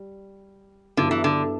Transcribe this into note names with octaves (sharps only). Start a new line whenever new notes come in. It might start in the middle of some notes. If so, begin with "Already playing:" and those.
Already playing: G3
G2 D3 F#3 B3 E4
E3
D3